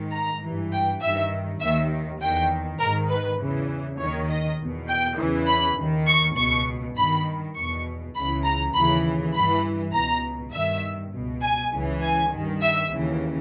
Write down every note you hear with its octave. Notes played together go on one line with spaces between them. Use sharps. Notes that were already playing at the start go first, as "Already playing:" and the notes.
Already playing: G#2 D#3
A#5
G2 E3
G5
G2 D#3 E5
D#2 D#3 E5
E2 D#3 G5
G#2 D#3 A#4
B4
E2 C#3 E3
D#2 D#3 C#5
D#5
E2 B2
G5
E2 C#3 E3
B5
D#2 D#3
C#6
C#2 B2 C#6
G2 D#3 B5
E2 B2 C#6
C#2 C#3 E3 B5
A#5
D#2 C#3 E3 B5
G2 E3 B5
C#2 B2 A#5
G2 D#3 E5
C#2 B2
G#5
C#2 C#3 E3
G#5
G2 D#3
E5
D#2 C#3 E3